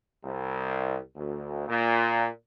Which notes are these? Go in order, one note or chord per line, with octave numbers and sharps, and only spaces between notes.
C2
D2
A#2